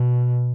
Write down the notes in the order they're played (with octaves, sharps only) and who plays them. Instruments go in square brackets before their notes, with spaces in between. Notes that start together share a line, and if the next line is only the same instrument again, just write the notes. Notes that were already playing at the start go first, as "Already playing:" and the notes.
Already playing: [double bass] B2